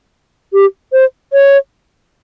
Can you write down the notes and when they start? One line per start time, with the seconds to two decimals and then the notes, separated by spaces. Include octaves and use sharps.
0.53 G4
0.93 C5
1.33 C#5